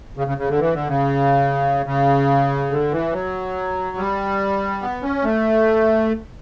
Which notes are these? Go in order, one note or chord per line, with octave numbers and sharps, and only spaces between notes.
C#3
C#3
C#3
D3
E3
D3
C#3
C#3
D3
E3
F#3
G3
B3
C#4
A3